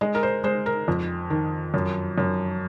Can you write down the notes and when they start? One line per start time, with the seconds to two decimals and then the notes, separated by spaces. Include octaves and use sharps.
0.01 G#3 D#5
0.15 A#4
0.23 C5
0.44 G#3 C5
0.66 A#4
0.88 F2
1.30 D#3
1.74 F#2
2.18 F#2